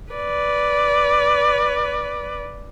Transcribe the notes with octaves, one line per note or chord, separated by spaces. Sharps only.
B4 D5